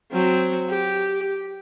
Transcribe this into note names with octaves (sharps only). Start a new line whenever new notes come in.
F#3 C4
G4